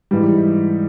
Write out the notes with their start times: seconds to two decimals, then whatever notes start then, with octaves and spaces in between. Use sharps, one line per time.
0.11 G#2 E3 G3